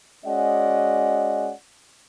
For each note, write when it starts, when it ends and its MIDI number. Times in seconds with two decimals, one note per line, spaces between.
0.25 1.51 56
0.25 1.51 61
0.25 1.51 66
0.25 1.51 74
0.25 1.51 75
0.25 1.51 78